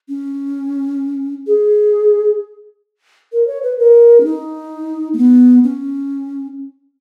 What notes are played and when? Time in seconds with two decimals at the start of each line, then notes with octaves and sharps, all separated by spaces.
0.09 C#4
1.47 G#4
3.33 A#4
3.47 C#5
3.63 B4
3.79 A#4
4.20 C#4
4.25 D#4
5.13 A#3
5.17 B3
5.64 C#4